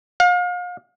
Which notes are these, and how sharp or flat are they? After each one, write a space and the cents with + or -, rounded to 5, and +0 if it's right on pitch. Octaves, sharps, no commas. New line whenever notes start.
F5 +35